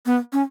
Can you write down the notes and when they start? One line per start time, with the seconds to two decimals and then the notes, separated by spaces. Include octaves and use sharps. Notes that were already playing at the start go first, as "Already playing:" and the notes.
0.06 B3
0.33 C#4